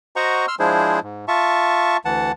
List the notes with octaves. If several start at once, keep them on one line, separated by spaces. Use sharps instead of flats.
F#4 C5 D#5 F#5 A#5 C#6
C6 E6 F6
F3 G#3 D4 E4 G#4 C5
G#2
F4 E5 A5 C#6
D2 E3 F#5 A5